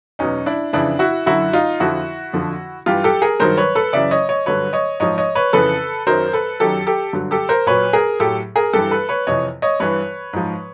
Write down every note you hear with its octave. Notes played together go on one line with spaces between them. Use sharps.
E2 B2 F#3 C#4 D#4
D4 E4
F2 C#3 E3 D4 E4
E4 F#4
F#2 D3 F#3 E4 F#4
D#4 F4
F2 D3 F3 E4 F#4
F2 D3 F3
G2 E3 F4 G4
G4 A4
G#4 A#4
G2 D#3 F#3 A#4 C5
B4 C#5
A4 B4
F#2 C#3 E3 D5 E5
C#5 D#5
C#5 D#5
G2 D3 F#3 B4 C#5
C#5 D#5
G#2 F3 C#5 D#5
C#5 D#5
B4 C#5
F2 C#3 E3 A4 B4
F#2 D#3 F#3 A#4 C5
A4 B4
F#2 D#3 F#3 G4 A4
G4 A4
G2 D3 F#3
G4 A4
A#4 C5
A#2 F#3 B4 C#5
G#4 A#4
A2 F#3 G4 A4
G#4 A#4
G2 E3 G4 A4
A4 B4
B4 C#5
F2 C3 E3 C#5 D#5
C#5 D#5
G2 E3 B4 C#5
G#2 F3